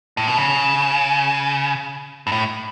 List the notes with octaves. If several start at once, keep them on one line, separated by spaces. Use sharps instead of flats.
A2
B2
C#3
G2
A2